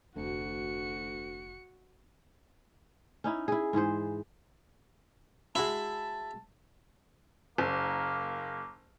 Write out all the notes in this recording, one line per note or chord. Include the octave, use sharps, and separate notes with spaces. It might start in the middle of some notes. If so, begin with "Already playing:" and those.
F1 D2 F#4 C#7
C#4 D#4 E4
E4 G#4
G#2 E3 G#4 C5
G#3 E4 F#4 G#4 A5
F#1 A#3